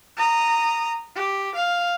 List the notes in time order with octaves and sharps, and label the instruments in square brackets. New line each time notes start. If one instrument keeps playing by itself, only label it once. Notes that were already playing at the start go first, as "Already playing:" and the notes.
[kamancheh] A#5 D#6
G4
F5